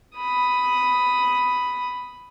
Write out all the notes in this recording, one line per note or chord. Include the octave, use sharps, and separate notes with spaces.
B5 D#6